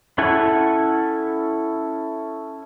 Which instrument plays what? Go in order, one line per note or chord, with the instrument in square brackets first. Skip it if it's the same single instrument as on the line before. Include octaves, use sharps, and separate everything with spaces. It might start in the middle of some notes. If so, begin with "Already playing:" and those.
[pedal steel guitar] C#4 E4 A4 F#5 G#5